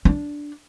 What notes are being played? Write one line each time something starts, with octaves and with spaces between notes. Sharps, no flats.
D4